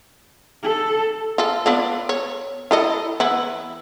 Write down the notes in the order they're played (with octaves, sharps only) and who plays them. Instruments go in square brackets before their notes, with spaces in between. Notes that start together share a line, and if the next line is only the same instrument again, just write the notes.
[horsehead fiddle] A4
[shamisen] F4 A4
B3 D4 F4
C#5
E4 A4 D#5
E3 B3 E4